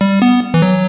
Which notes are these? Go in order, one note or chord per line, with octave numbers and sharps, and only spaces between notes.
G3
B3
E3
F#3